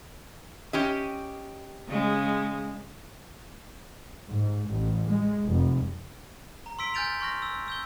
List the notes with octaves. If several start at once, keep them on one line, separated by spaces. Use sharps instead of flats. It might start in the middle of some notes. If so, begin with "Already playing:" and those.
C#4 G4 D#5
C#3 G#3
G#2
A1
G#3
F1
A#5
C6 E6 B6 D7 G7
G#5 F6 G6 A6 D7 F7
C6 C#6 F6 A#6
E6
E6 G6 G7